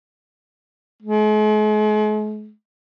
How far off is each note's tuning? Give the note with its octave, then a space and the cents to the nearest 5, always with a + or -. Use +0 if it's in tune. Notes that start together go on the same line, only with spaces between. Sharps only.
G#3 +45